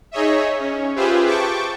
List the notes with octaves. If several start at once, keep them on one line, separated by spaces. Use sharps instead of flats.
D#4 G#4 C#5 D#5 E5
C#4
F4 G4 G#4 B4 C5 E5
G5 A5 C#6 D6